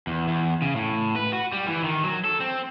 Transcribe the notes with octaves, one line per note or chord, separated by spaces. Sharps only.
E2
E2
C#3
A2
B4
F#4
G3
E3
D#3
F#3
A4
C4